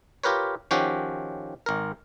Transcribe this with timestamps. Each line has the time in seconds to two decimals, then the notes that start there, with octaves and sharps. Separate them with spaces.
0.24 F4 G4 A#4 B4 C#5
0.71 D#3 F3 C#4 F#4 G4
1.66 G#1 A#4